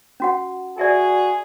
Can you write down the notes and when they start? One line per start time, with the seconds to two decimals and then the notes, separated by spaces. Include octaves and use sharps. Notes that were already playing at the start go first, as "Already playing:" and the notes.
0.20 C#4 F#4 F#5
0.78 F#4 G#4 D5 E5 G#5